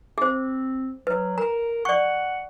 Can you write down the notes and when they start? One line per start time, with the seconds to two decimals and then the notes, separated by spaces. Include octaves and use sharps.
0.18 C4 G#4 C5
1.07 F#3 B4
1.38 A#4 A#5
1.85 D5 F#5 C#6